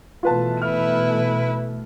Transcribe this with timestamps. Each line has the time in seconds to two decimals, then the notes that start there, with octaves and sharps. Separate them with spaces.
0.23 B2 E3 A3 F4 B4 A5
0.62 E4 B4 F6